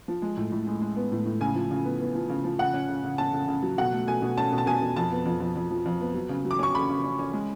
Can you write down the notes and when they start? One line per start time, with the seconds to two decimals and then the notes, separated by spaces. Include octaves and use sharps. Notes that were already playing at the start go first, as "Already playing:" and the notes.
0.08 F3
0.22 G#3
0.37 A2
0.52 A2
0.67 G#3
0.81 G#3
0.96 B3
1.12 A2
1.25 A2
1.40 C#3 G#5
1.55 F3
1.71 C#3
1.85 B3
2.01 B3
2.15 F3
2.29 C#3
2.44 F3
2.59 C#3 F#5
2.74 C#4
2.88 C#3
3.04 C#3
3.18 C#4 A5
3.33 C#3
3.48 C#3
3.63 F#3
3.78 B2 F#5
3.92 A3
4.07 B2 G#5
4.22 B2
4.37 C#4 A5
4.52 B2
4.58 A5
4.66 B2 G#5
4.81 B2
4.96 F2 A5
5.12 B3
5.26 F2
5.41 F2
5.56 F2
5.71 F3
5.86 F2
6.01 B3
6.14 F#3
6.29 C#3
6.45 F#3
6.51 D6
6.59 C#4 C#6
6.74 C#3 B5
6.89 C#3
7.04 C#4
7.19 C#4
7.33 G#3